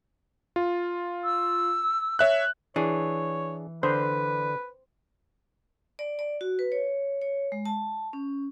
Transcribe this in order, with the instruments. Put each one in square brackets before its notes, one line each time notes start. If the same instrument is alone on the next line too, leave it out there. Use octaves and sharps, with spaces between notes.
[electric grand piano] F4
[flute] E6
[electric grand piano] C#5 E5 F#6
[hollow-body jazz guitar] E3 [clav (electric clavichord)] D4 G#4 [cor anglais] C#5
[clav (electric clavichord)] D3 [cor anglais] B4 [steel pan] C5
[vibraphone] D5
D5
F#4
B4
C#5
C#5
G#3
A5
C#4